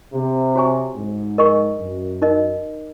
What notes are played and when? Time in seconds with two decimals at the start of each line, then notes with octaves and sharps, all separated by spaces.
0.14 C3
0.55 F#4 C#5 G#5 C#6
0.97 G#2
1.38 A#4 D#5 G#5 C#6
1.80 F#2
2.22 D#4 A#4 D#5